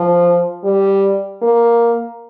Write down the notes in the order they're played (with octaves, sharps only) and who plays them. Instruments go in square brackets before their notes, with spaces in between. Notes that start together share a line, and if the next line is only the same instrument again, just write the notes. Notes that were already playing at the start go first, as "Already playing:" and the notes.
Already playing: [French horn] F3
G3
A#3